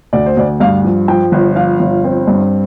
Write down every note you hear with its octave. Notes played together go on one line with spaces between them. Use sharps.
D2 D5
C5
D2 D5
G2 F5
F3
F3 G5
G1
F3 F5
G1
C4
G2